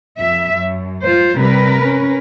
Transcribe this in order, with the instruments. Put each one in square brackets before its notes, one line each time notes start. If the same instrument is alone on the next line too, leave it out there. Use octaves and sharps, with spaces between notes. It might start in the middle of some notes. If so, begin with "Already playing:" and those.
[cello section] F2 E5
F#2
[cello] F4 C5
[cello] C3 G3 [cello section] A#4 B4
[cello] C#4